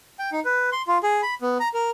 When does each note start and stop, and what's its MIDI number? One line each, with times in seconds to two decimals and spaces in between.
0.19 0.30 79
0.32 0.40 63
0.45 0.70 71
0.72 0.82 84
0.88 0.98 65
1.03 1.21 68
1.22 1.34 83
1.42 1.58 59
1.60 1.68 82
1.74 1.90 70